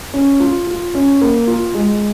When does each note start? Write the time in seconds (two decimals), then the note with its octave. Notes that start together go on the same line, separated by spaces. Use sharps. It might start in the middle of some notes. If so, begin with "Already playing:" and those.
0.13 C#4
0.40 F4
0.67 F4
0.95 C#4
1.21 A#3
1.47 F4
1.74 G#3